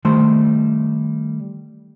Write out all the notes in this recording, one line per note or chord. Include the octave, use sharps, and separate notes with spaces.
D#3 G3 A3 C5 C6